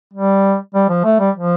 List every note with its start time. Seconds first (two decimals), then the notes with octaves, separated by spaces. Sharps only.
0.13 G3
0.74 G3
0.89 F3
1.04 A3
1.19 G3
1.35 F3